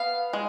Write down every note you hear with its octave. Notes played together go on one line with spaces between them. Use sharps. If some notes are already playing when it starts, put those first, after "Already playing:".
Already playing: B3 F5
G#3